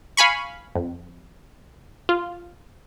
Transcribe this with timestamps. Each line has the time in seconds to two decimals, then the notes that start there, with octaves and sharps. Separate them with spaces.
0.17 F5 G#5 B5 C#6
0.75 F2
2.09 F4